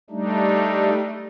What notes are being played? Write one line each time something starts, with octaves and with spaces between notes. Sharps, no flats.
G3 A3 D4 D#4